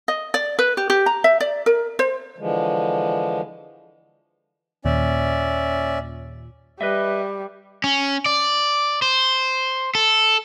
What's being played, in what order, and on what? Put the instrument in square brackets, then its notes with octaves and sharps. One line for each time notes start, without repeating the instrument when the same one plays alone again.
[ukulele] D#5
D5
B4
G4
G4
A#5
E5
D5
A#4
C5
[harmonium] D3 E3 F3 G#3
[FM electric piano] D#2 A#2 [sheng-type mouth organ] C#4 D5 E5
[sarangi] G3 [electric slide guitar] B4 D#5 E5
[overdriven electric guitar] C#4
D5
C5
A4